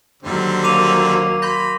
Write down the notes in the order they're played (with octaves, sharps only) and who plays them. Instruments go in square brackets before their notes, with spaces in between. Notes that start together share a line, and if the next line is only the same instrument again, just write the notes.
[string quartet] D#2 F#3 [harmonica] D3 G3 C4
[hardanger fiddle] A#3 [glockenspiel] D6 D#7 F7
[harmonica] B5 [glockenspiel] C6 G6 A#6